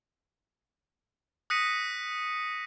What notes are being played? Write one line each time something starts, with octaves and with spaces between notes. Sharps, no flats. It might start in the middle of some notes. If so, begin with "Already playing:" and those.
D#6 F#6 A#6 B6 C#7 D#7